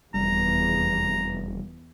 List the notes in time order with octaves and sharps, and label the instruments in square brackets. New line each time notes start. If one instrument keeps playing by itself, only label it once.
[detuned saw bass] F1 [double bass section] E2 [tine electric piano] G3 [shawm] A#5